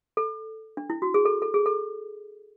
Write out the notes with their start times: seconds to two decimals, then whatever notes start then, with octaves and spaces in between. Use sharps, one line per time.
0.17 A4
0.77 D4
0.90 E4
1.02 F#4
1.14 G#4
1.25 A4
1.42 A4
1.54 G#4
1.66 A4